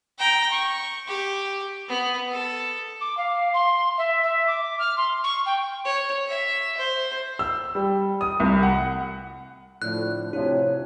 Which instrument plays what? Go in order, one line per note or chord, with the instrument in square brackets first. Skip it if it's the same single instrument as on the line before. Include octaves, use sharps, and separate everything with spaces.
[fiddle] G5 A#5
C#6
G4
B3
A4
[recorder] D6
F5
C6
E5
E5
D6
F6
C6
C#6
G5
[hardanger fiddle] C#5
E5
C5
[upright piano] E6
G3
D#6
C2
F#5
[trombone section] A2 D3 F3 [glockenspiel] F#6
[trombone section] C3 F3 C4 [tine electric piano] D4 E4 F#4 [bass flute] C#5